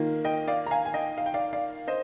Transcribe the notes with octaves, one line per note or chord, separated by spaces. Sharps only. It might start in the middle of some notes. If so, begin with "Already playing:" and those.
Already playing: D#3 A#3 F4
D#5 G5
D5 F5
A#5
F5 G#5
G#5
D#5 G5
F5
G5
D5 F5
D5 F5
C5 D#5